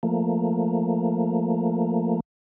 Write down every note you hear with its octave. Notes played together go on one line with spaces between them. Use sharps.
F3 A3 A#3